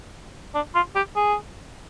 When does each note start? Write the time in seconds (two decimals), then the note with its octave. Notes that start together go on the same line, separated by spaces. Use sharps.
0.54 D4
0.75 F4
0.95 G4
1.16 G#4